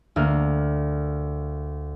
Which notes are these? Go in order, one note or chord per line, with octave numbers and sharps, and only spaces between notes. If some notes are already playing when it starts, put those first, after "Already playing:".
D2 A#3 F6